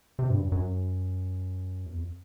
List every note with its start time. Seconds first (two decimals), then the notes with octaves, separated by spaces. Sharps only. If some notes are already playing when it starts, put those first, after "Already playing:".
0.19 C3
0.30 G2
0.41 F#2
0.52 F#2
1.86 E2
1.97 F2